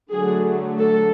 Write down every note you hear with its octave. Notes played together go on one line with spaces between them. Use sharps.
D3 F#3 A3 G#4
A4